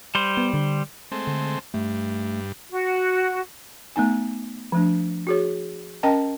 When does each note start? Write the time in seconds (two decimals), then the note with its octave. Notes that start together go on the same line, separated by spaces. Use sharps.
0.15 G3 C5
0.37 B3
0.54 D3
1.12 G#3 A3 C4
1.27 D3
1.74 G2 A3
2.71 F#4
3.96 A3 B3 D#4 G#5
4.72 F3 A3 D4
5.27 F#4 G#4 C#5
6.03 C#4 A#4 D#5 G5 A5 A#5